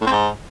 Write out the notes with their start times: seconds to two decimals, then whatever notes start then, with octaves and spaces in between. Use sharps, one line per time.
0.01 A2
0.07 C4
0.12 G#2